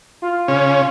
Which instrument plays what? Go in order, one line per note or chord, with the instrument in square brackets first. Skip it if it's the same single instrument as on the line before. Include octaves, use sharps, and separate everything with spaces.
[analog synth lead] F4
[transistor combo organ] C#3 C#4